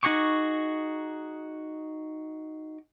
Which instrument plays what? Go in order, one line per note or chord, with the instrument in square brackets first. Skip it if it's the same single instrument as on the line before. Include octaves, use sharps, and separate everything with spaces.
[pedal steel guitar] D#4 F#4 G#4 C#6 D6